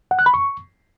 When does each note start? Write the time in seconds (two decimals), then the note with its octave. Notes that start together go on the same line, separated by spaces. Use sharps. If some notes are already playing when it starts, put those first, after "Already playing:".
0.11 F#5
0.19 F#6
0.26 B5
0.34 C#6